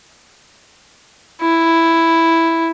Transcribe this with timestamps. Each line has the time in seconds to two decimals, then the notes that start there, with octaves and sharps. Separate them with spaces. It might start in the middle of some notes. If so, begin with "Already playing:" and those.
1.42 E4